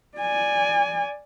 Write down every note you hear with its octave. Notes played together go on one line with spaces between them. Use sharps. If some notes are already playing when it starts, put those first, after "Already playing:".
D5 G#5